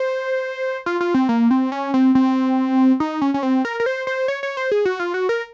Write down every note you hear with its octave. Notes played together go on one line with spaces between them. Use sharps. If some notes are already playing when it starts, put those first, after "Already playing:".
Already playing: C5
F4
F4
C4
A#3
C4
C#4
C4
C4
D#4
C#4
C#4
C4
A#4
A#4
C5
C5
C#5
C#5
C5
G#4
F#4
F4
F#4
A#4